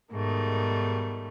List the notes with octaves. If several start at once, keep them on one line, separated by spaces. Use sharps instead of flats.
G#2 B2 D#3 G3 A3